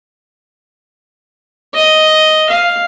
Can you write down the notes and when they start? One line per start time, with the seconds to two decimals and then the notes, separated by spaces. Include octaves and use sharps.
1.74 D#5
2.49 F5